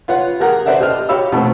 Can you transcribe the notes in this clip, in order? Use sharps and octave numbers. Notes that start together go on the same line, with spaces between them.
F4 B4 C#5 F#5
G4 G#4 A#4 F#5
B4 C5 D5 E5 F#5
G4 A4 D#5 F6
F#4 G4 C#5 F5 B5 E6
B2 A3 B3 C4